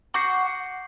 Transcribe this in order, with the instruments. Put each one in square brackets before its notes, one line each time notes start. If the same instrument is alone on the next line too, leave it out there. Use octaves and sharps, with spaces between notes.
[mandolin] F#4 [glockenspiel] D6 G6 C7